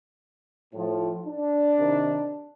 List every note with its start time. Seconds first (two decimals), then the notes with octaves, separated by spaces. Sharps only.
0.73 A2 F3
1.25 D4
1.78 C3 D#3